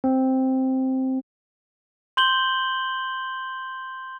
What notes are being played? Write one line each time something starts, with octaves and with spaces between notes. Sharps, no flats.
C4
C6 G6 F#7 G7